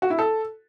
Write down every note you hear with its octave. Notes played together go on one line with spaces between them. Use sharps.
F#4
E4
A4